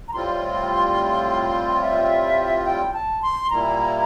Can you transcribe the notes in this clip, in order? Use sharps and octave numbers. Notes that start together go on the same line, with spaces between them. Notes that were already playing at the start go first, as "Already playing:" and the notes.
A#5
A2 G3 C4 F4 C6
E5
G5
A5
C6
A#2 G3 A#3 E4 A#5